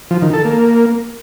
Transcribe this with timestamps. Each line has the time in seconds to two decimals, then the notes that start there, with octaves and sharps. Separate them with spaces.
0.11 F3
0.22 D#3
0.33 A4
0.45 A#3